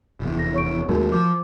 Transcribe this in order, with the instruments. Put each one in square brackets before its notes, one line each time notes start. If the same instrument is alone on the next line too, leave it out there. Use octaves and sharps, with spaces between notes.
[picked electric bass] F1 E2
[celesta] A#6
C#5 C#6 D7
[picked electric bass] D#2 G#3 A3 [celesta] D#4 F#4 A#4
[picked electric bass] F3 [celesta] D6